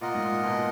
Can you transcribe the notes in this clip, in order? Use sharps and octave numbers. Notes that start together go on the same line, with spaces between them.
A#2 F4 A#4 D#5 F#5
G#2
A#2
B2
A#2